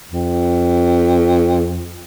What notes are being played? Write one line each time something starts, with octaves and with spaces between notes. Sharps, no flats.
F2